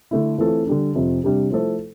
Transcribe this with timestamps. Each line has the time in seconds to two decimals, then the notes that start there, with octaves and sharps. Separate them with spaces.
0.11 D3 A3 E4
0.38 E3 A3 C4 F4 A4
0.67 D3 G3 D4
0.95 F2 C3 F3
1.24 C3 G3 D4 G4
1.51 F3 A3 E4 A4 C5